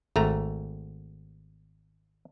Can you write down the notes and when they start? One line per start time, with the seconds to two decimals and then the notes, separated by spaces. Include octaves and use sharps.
0.16 G#1 A3 A#5